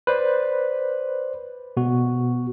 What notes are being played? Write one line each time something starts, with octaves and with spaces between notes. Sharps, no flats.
B4 C5 D5
B2 B3 F#4